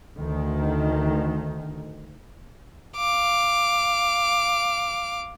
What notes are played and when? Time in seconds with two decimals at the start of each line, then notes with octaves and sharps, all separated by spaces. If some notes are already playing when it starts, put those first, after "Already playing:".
0.16 D2 D#3
2.97 F5 D6